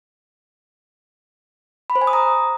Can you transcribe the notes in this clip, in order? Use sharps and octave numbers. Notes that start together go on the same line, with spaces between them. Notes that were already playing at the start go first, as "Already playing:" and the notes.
B5
C5
G#5
D#6
A#5